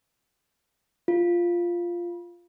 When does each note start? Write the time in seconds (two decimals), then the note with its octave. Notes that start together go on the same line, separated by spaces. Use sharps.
1.08 F4